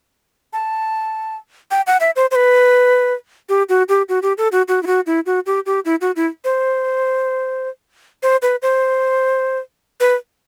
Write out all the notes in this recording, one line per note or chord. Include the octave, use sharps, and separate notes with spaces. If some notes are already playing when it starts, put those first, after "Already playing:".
A5
G5
F#5
E5
C5
C5
B4
G4
F#4
G4
F#4
G4
A4
F#4
F#4
E4
F#4
E4
F#4
G4
G4
E4
F#4
E4
C5
C5
B4
C5
B4